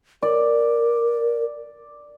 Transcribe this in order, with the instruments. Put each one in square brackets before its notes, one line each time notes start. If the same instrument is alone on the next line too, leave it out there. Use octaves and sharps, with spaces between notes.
[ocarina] A#4 [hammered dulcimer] D5